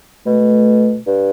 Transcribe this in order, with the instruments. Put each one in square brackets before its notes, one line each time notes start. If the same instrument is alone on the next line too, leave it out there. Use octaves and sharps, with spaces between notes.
[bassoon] B2 [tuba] A3
[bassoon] G2